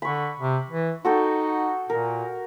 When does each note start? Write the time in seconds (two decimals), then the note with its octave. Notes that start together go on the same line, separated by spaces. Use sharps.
0.02 D3 B5 C#6
0.40 C3
0.70 E3
1.05 D#4 F#4 A4 G5
1.90 A#2 A#4